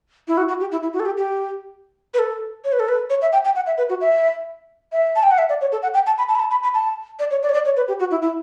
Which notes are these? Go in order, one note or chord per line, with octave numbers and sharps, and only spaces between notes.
E4
F#4
F#4
G4
E4
E4
F#4
A4
G4
G4
B4
A4
C#5
B4
A4
B4
C#5
E5
G5
G5
F#5
E5
B4
F#4
E5
E5
A5
G5
F#5
E5
D5
C#5
A4
F#5
G5
A5
B5
A5
B5
A5
B5
B5
A5
D5
C#5
D5
C#5
D5
C#5
B4
G4
F#4
E4
E4